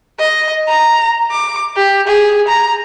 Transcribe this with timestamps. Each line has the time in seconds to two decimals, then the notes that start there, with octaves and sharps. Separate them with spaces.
0.19 D#5
0.68 A#5
1.31 D6
1.77 G4
2.08 G#4
2.48 A#5